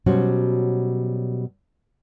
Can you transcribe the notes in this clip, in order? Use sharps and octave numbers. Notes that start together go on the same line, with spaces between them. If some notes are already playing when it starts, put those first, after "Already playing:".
B2 F#3 G3 C#4 F#4 C5